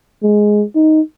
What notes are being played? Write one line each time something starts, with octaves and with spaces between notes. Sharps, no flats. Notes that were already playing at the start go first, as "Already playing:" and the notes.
G#3
D#4